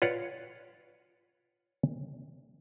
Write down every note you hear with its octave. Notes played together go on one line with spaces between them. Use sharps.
F4 B4 C#5 D5 F5 F#5